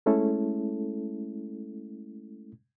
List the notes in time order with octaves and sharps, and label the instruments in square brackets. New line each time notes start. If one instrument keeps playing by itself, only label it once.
[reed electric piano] G#3 A3 C#4 E4 A4